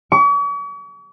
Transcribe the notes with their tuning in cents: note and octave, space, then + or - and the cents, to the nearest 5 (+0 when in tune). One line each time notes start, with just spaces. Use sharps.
C#6 +45